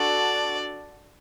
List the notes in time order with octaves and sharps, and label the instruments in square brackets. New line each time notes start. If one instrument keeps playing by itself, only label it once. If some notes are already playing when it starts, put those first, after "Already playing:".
Already playing: [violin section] D4 F#4 A4 [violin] D5